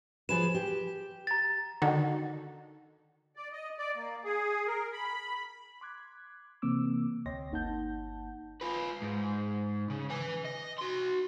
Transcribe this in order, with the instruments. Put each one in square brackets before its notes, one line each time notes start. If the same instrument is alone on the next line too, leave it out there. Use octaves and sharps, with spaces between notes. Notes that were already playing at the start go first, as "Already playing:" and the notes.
[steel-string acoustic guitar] F3 G#4 B4 [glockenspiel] E7
[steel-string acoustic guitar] G4
[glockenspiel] A#5 A6
[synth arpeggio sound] D3 D#3 D4 D#4 F#4 A4
[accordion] D5
D#5
D5
A#3
G#4
A#4
B5
[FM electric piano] C6 D6 F#6 G#6
C3 E3 A#3 C4 D6 E6
D2 C#5 D#5 G5 C6 A#6
G1 A#3 D#4 F#5 A5 G6
[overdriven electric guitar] F4 B4
G#2
C#3
B4 G#5
D#5
F#4 C6